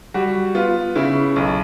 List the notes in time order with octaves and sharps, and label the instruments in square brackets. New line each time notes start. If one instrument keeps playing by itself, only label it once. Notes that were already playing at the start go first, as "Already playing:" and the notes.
[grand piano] G3 F#4
B3 F4
C#3 E4
B1